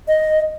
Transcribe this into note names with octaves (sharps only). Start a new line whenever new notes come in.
D#5